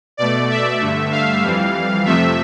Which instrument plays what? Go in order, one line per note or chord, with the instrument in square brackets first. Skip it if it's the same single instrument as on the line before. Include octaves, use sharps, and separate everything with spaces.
[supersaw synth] B2 A3 D5
E5
G2 D3 A3
F5
F2 E3 G3
F2 C3 F3 A3 E5